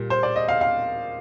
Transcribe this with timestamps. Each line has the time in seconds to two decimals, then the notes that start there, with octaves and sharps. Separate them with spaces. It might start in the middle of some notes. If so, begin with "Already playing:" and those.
Already playing: A#2 G3 A#3
0.10 C5
0.23 D5
0.36 D#5
0.49 F5
0.61 F5